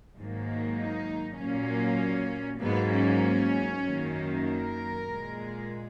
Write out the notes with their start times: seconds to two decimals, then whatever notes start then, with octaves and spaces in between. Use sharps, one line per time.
0.17 G#2 D#3 F#3 A#3
0.78 D#4
1.39 A#2 F#3 A#3 C#4
2.61 G#2 F#3 A#3 B3
2.92 C#4
3.84 F#2 D#3 A#3
4.45 A#4
5.06 A#2 G#3